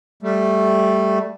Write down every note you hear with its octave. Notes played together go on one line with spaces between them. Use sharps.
G3 A3